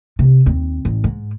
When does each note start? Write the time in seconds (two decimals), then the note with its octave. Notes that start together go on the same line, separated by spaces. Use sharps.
0.19 C3
0.46 D#2 C4
0.85 A1
1.04 G#2